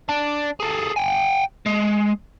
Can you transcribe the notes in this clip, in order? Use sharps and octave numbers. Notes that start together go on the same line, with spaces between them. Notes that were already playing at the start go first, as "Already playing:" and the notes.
D4
G#4 A4
G5 G#5
G#3